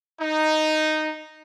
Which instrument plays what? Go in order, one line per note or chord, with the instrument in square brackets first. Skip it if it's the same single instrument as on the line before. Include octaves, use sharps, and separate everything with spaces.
[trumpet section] D#4